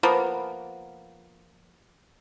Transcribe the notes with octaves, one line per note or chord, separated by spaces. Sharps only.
F3 A#3 B3